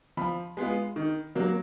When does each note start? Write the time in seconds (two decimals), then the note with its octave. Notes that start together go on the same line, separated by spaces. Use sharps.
0.17 F3 B5
0.57 G#3 B3 F4
0.96 D#3
1.35 F#3 A#3